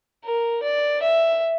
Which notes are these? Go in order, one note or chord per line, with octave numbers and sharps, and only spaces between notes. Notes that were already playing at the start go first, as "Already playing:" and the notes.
A#4
D5
E5